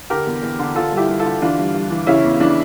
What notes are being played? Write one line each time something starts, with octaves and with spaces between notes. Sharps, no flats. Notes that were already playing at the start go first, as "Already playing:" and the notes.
D3 G4 A#4
E2
E2
D3
D3 F4 A4
G2
E4 G4
G2
F4 A4
D3
E3 D4 F4
G2
G2
E3
C#3 C#4 E4
E2
E3 D4